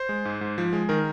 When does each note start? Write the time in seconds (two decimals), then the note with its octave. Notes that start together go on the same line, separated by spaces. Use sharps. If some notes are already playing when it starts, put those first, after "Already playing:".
Already playing: C5
0.09 G#3
0.25 G#2
0.41 G#2
0.58 F3
0.73 G#3
0.89 D#3 A#4